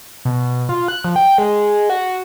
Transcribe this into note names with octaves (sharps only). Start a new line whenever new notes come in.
B2
F4
F#6
F3
G5
G#3
F#4